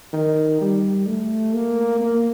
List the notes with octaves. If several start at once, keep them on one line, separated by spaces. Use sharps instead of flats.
D#3
G3
A3
A#3
A#3